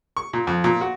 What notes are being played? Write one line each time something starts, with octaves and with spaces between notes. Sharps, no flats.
C#6
A#2
F2
A#2
F#4